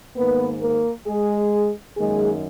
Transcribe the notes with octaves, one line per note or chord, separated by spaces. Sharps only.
G#2 D#3 A#3 B3 B4
A#3 A#4
G#3 G#4
F#2 D#3 G#3 A#3 G#4